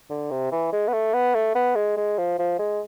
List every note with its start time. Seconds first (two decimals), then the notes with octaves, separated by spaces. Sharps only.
0.10 D3
0.31 C3
0.52 E3
0.72 G#3
0.88 B3
0.93 A3
1.14 B3
1.34 A3
1.55 B3
1.76 G#3
1.97 G#3
2.18 F3
2.39 F3
2.59 G#3